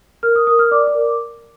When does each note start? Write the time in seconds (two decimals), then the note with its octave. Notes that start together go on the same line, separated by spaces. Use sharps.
0.23 A#4 F6
0.36 D#6
0.47 A#4 D#6
0.59 F6
0.71 D5 D6
0.87 D6
0.95 A#4